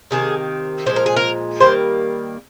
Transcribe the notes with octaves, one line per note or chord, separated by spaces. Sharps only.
C3 D#3 A#3 G#4
A#2 F3 G#3 C5
A#4
G#4
A#4
D#3 G3 A#3 C5